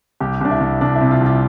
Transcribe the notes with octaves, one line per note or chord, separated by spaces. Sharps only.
C2 G4
C2 D4
E4
C2
C2 D4
E4
C3
F4
C2 F4